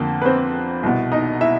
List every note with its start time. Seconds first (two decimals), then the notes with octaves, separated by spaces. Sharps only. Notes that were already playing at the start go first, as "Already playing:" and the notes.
Already playing: F2 D3 A#3
0.22 B4
0.25 C4 C5
0.83 C2 B2
1.12 D#4 D#5
1.41 E4 E5